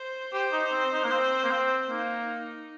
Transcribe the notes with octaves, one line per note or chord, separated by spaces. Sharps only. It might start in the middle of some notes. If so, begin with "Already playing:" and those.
Already playing: C5
G4 C5
D#4
C4
D#4
A#3
C4
A#3
C4
A#3 D#4